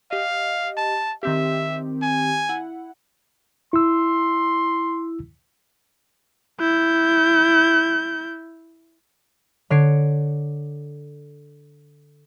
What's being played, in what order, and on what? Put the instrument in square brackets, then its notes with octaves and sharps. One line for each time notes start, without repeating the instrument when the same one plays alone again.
[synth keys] G4 D#5 [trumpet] F5
[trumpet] A5
[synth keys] D#3 C4 G4 [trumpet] E5
[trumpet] G#5
[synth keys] E4 F#5
[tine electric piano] E4 E6 [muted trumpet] C6
[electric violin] E4 G6
[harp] D3 C#5 C7 D7